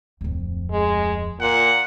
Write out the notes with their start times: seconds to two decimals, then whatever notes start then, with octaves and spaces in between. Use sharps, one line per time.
0.21 D1 F2
0.71 G#3
1.40 A#2 F#5